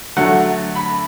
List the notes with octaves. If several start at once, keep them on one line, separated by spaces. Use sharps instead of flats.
D3 F#3 A3 F#5
B5